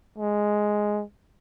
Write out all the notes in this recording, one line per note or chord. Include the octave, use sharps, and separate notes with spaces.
G#3